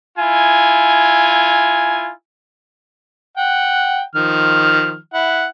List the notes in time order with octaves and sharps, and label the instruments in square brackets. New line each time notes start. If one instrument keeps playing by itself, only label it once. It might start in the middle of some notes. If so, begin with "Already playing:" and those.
[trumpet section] E4 F4 G#5
[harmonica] F#5 G5
D#3 F3 F6
E4 F#5